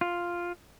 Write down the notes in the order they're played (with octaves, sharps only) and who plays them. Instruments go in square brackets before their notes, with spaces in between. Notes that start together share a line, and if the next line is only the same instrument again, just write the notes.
[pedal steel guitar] F4